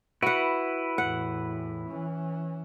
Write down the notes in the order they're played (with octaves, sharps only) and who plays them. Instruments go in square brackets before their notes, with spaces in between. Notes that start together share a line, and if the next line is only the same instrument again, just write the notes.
[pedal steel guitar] E4 B4 [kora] F#4 F#5
[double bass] E2 A2 [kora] F#5
[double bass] E3 C#4